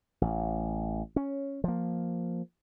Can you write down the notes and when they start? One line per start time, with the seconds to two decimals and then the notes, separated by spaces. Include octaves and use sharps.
0.22 A1
1.16 C#4
1.64 F3 A#3